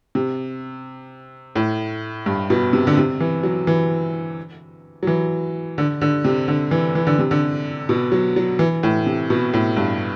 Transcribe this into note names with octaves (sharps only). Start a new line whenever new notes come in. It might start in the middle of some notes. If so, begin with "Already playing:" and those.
C3
A2
G2
B2
C3
D3
C3
E3
F#3
E3
F#3
E3
D3
D3
C3
D3
E3
E3
D3
C3
D3
B2
F#3
F#3
E3
A2
C3
B2
A2
G2